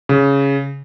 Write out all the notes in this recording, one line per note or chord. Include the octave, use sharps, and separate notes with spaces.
C#3